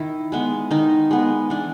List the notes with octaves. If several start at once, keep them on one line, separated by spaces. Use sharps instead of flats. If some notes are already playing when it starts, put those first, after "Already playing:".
Already playing: D#3 E4
G#3 B3
D#3 D#4
G#3 B3
E3 D4